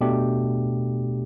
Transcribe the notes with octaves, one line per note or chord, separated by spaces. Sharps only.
B2 A3 D4 G4